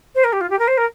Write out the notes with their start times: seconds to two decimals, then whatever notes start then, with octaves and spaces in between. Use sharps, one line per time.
0.15 C5
0.24 A#4
0.32 G4
0.41 F4
0.50 G4
0.59 A#4
0.68 C5
0.77 A#4